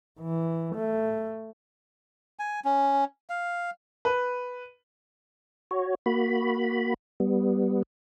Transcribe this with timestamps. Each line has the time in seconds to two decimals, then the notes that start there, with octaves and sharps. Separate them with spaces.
0.20 E3
0.75 A3
2.39 G#5
2.65 C#4
3.30 F5
4.05 B4
5.71 F#4 C#5
6.06 A#3 F#4 B5
7.20 G3 B3